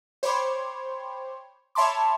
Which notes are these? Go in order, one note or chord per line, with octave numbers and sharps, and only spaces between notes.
C5 C#5 G5 B5 C6 D6
C#5 E5 A5 B5 C6 D6